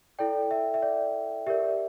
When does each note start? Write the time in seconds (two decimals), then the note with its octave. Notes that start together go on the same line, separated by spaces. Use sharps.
0.19 E4 A4 D5 G5
0.51 E5
0.74 E5
0.82 D5
1.47 G4 A#4 D5 E5